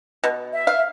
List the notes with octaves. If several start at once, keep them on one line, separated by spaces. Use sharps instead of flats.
B2
E5
F5